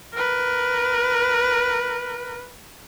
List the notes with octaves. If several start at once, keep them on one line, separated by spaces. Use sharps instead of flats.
A#4 B4